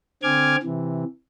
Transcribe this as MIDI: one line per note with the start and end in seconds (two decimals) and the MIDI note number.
0.23 0.56 50
0.23 0.56 60
0.23 0.56 80
0.23 0.56 86
0.23 0.56 89
0.23 0.56 92
0.63 1.04 48
0.63 1.04 52